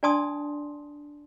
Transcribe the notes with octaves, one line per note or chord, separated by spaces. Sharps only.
D4 D5 G#5 A5 C6 D#6